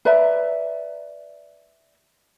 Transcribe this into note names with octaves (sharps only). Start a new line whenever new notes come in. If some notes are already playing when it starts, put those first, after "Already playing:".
B4 D5 E5 A#5